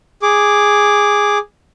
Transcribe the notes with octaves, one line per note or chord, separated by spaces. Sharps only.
G#4 D6